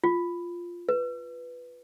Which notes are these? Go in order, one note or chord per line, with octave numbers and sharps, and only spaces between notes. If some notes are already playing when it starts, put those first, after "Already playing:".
F4
B4